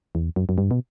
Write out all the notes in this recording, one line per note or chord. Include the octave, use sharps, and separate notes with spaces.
E2
F#2
F#2
G2
B2